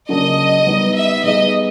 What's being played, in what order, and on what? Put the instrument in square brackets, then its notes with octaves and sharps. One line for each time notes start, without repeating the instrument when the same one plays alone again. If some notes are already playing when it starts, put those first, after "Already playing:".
[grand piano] C#3 F#3 A#3 D4 [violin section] D#5
[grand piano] G3 B3 D#4
[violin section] E5
[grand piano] G3 B3 D#4 G#4 [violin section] D#5